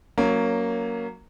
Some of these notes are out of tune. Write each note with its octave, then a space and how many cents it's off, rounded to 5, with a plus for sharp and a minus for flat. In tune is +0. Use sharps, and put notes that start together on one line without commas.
F#3 +0 A#3 +0 C#4 +15